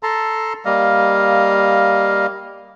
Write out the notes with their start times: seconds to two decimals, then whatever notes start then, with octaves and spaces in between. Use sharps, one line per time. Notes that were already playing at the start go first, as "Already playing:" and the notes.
0.03 A4 A5 A#5 C6
0.65 G3 A#3 D#5 F5